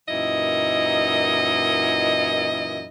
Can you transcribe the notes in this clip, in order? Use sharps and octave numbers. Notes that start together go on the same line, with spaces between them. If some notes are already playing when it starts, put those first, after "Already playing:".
F#2 A#2 E3 D#4 E4 D#5